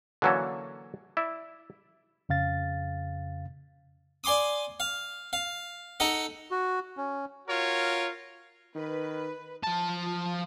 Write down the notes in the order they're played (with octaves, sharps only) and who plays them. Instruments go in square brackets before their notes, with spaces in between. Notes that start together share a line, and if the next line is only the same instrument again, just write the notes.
[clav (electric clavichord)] D3 E3 F#3 A#3 C#4 A4
E4 D5 E5
[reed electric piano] F2 C#3 F5 A6
[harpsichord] D5 G#5 C6 D6 D#6
F5
F5
D#4 A4 D#5 F#5
[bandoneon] F#4
C#4
[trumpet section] F4 F#4 A#4 C#5
[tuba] D#3 [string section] B4
[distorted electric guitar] F3 A5